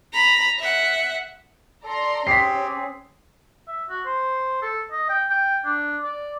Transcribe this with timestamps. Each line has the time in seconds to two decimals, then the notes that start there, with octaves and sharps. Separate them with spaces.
0.14 A#5 B5
0.59 E5 F#5
1.84 A4 D5 A#5 C6
2.27 C4 C#4 G4 G#4 B6 C7
3.68 E5
3.89 F#4
4.06 C5
4.62 A4
4.91 D#5
5.09 G5
5.29 G5
5.65 D4
6.04 D5